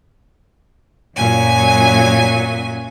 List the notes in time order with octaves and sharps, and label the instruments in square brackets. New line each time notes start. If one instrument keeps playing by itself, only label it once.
[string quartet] F#2 A#2 F#3 G#5